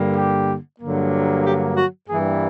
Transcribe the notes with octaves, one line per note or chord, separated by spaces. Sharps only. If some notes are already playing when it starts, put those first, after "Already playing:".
Already playing: G2 D3 G3 A#3
G4
G2 D3 F#3 A#3
G4
F#4
G2 E3 G3 A#3 G#4